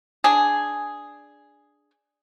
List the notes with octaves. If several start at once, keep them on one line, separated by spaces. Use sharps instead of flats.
D4 G#4